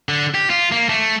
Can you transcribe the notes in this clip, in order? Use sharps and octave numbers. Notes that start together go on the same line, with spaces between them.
D3
G4
F4
A#3
A3